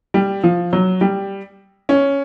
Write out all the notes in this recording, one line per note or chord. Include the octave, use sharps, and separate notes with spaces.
G3
F3
F#3
G3
C#4